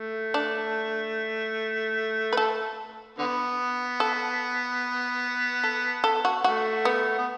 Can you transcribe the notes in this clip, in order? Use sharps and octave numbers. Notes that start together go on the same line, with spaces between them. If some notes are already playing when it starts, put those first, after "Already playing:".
Already playing: A3
D4
B4
A4
D3 B3
A4
A4
A4
F#4
A3 F#4
B3
B3